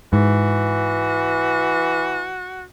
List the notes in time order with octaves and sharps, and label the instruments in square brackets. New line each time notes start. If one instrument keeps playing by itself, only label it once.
[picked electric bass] G#2 [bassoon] E3 [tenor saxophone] F#4